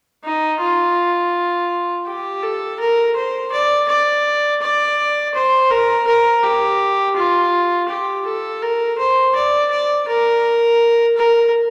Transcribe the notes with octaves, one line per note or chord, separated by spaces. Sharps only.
D#4
F4
G4
A4
A#4
C5
D5
D5
D5
C5
A#4
A#4
G4
F4
G4
A4
A#4
C5
D5
D5
A#4
A#4